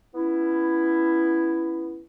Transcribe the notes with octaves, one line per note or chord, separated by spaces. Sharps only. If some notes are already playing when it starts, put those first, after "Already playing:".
B3 C#4 E4